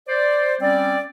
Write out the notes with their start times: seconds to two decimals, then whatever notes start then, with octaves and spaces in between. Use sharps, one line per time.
0.09 C5 D5
0.61 G3 C4 C#4 D5